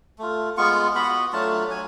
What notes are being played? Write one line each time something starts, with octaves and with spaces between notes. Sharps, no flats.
A3 F4
G#3 B3 F4 C#6
B3 F#4 B5
F#3 A3 D4 F4 A5
F#3 G#5